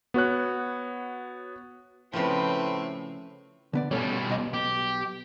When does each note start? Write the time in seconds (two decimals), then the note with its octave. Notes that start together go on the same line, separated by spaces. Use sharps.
0.14 B3 F#4 C#5 F#6
2.13 A2 C#3 F3 C4 B4
3.73 D3 B3 D5
3.91 B2 G3 C#4 A4 C#5
4.29 B1 D#5
4.54 G4